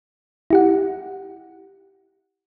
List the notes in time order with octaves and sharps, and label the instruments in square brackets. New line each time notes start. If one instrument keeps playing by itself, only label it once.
[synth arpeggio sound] E4 G4 F#5